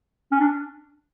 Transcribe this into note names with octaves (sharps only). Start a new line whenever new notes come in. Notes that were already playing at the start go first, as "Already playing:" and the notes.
C#4
D4